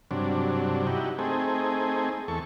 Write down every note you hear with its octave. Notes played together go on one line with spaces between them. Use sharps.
G2 C3 F#3 D4
D#4 E4 F#4 G4
A3 C4 D#4 G#4
E2 A4 C#6